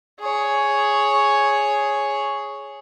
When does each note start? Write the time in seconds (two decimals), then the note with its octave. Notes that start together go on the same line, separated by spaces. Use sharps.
0.20 G#4 C#5